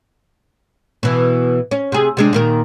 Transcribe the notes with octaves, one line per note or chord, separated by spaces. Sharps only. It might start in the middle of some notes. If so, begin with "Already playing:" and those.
B2 E3
C#4
C3 G#4
C3 G#3 D4
A#2 D#3 A#4